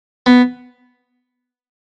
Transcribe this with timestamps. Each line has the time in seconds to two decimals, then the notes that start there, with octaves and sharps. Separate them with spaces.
0.26 B3